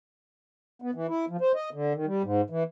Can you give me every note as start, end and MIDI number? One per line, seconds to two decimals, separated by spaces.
0.82 0.91 59
0.95 1.07 52
1.08 1.25 64
1.29 1.37 53
1.41 1.52 72
1.55 1.70 75
1.73 1.93 50
1.94 2.06 51
2.06 2.22 55
2.23 2.41 44
2.50 2.63 52